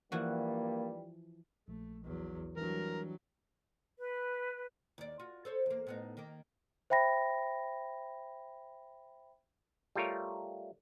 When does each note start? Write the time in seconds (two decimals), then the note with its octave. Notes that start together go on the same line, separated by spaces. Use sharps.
0.12 G2 E3 F3 G3 A#3 F#4
1.68 A#1 A3
2.05 E2 F#3
2.57 E3 F#3 G3 D4 A#4
3.99 B4
4.98 D#2 D5
5.20 F4 F#4
5.45 A4 C5 C#5
5.66 E2 A#3
5.87 A2 B3 D#4
6.17 D#3 A#3
6.90 C5 E5 G5 B5 A#6
9.95 G3 A3 F4 A#4 C#5